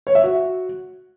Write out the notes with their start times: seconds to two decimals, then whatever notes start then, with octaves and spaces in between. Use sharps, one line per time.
0.07 C#5
0.15 E5
0.24 F#4